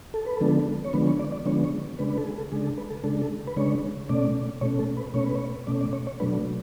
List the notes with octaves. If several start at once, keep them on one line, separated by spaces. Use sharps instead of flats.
A4
B4
D3 F3 G#3 B3 D4 A4
C#5
D3 F3 G#3 B3 D4 B4
C#5
D5
D5
D3 F3 G#3 B3 D4 C#5
C#5
C#3 G#3 D4 B4
B4
A4
G#4
A4
C#3 G#3 D4 G#4
A4
B4
A4
C#3 G#3 D4 A4
A4
B4
C#3 G#3 D4 C#5
B2 A3 C#4 D5
B2 A3 C#4 C#5
A4
B4
B2 A3 C#4 C#5
B4
C#5
B2 A3 C#4 D5
D5
C#5
C#5
B2 F#3 A3 D4 B4